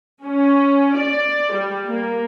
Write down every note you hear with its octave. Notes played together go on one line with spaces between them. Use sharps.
C#4
D5
G3
A#3